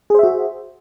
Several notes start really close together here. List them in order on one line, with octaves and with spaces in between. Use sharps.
G#4 C5 E5 F#4